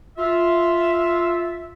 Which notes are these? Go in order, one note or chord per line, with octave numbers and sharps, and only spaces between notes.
F4 E5